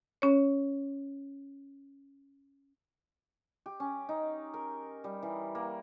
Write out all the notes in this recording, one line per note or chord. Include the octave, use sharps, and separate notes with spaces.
C#4 C#5
G4
C#4
D#4
A#4
G3
E3
A#3